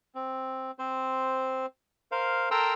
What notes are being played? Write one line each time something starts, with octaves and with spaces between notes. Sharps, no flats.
C4
C4 C5
A#4 C5 F5
A4 A#4 G5 A#5 C6 E6